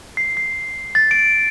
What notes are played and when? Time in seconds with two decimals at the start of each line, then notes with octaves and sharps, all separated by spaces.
0.17 C7
0.37 C7
0.95 A6
1.11 D7